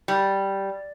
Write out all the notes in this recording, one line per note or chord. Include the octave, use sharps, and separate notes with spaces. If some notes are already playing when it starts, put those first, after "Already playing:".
G3